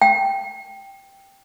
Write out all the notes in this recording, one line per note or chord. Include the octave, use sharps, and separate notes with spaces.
G5